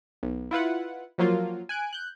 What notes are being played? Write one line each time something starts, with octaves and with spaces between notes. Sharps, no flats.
B1
E4 F4 B4 F#5
F3 F#3 A#3 F4
G#5 F#6 D7
F#6 G6